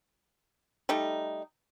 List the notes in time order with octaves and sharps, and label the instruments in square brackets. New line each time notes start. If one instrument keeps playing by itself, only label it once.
[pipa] G3 A3 D#4